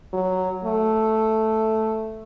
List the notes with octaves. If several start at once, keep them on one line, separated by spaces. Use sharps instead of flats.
F#3
A3